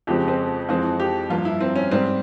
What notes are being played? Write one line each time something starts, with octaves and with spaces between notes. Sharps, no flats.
F2 C#3 F3 G#3 C4 G4
C4
F2 E3 G#3 C4 F4
G4
G2 F3 A#3 F4
E4
C4
C#4
G#2 G3 C4